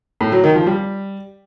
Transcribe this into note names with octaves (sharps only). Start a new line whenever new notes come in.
A2
F#3
D#3
F3
G3